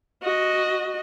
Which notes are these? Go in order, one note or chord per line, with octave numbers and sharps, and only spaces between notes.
F#4 D#5